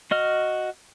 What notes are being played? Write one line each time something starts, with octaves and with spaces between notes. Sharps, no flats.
F#4 D#5 F6